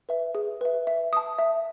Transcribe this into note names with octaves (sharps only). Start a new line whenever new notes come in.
B4 E5
G#4
B4 E5
E5
A5 D#6
E5